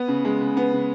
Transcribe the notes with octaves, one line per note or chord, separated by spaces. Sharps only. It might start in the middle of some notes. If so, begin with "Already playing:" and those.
Already playing: B3 B4
C#3
G#3
C#3
B3
C#3